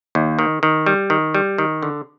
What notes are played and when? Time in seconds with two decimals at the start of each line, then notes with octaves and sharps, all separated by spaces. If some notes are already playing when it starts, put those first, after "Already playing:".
0.15 D#2
0.39 D#3
0.63 D#3
0.86 G3
1.10 D#3
1.35 G3
1.58 D#3
1.83 D3